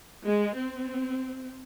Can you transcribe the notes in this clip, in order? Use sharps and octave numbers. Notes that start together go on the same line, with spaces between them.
G#3
C4